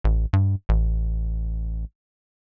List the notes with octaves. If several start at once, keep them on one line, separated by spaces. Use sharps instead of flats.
A1
G2
A1